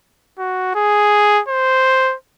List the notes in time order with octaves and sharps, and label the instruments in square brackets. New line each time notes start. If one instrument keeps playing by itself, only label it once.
[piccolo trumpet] F#4
G#4
C5